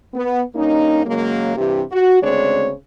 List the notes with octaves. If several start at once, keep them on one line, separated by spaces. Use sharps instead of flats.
B3
G2 A#3 C#4 D#4
C#3 F#3 G#3 A#3
G2 C3 E3 G4
F#4
D2 C#3 G#3 C4 D4 C#5